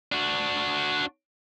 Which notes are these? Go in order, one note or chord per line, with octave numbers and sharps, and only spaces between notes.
D4 F#4